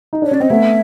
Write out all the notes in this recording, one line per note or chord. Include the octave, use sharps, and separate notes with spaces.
D#4
D4 C#5
C#4 D5
C4 D#5
A3 B3 E5